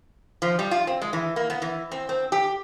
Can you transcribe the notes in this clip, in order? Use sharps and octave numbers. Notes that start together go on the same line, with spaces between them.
F3
G3
F4
C4
G#3
E3
A#3
B3
E3
C4
C4
G4